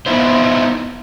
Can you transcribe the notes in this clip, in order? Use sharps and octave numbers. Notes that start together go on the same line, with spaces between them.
B3 D#4 E4 C5